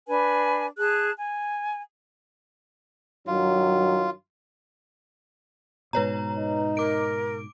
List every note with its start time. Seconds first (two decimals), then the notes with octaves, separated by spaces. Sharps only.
0.07 D4 B4 G#5
0.78 G#4 A5 F#6
1.16 G#5
3.27 G2 D#3 F#3 F4
5.93 G#2 B2 B4 C#5 A#5
6.38 D#4
6.77 A#4 D6 D7